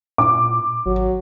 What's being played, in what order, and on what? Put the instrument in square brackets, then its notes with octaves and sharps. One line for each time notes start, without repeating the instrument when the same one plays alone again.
[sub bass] A#2 [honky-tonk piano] D6
[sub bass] G#1 [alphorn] F#3